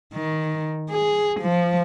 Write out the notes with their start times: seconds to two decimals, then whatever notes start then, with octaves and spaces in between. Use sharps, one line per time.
0.14 D#3
0.90 G#4
1.41 F3